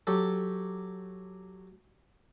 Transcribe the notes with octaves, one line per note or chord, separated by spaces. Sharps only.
F#3 G4 A4